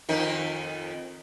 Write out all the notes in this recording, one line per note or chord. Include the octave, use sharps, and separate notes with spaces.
F2 D#3 D#4